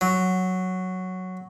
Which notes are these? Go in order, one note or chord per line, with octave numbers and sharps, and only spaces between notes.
F#3